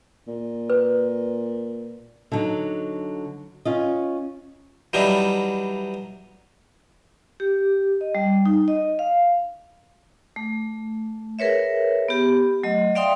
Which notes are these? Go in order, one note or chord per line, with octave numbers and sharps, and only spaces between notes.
A#2
B4
D3 F#3 D#4
C#4 F4 D#5
E3 F#3 G3 D4 D#4
G4
D#5
G3
D#4
D#5
F5
A3
G#4 A#4 B4 C#5 E5
B3 G4
F#3 A3 D#5
D5 E5 F5 G5 C6 D#6